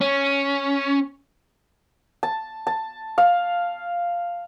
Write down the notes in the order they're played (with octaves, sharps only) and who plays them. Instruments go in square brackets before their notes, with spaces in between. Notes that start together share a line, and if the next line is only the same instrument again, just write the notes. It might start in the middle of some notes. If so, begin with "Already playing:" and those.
[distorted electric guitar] C#4
[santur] A5
A5
F5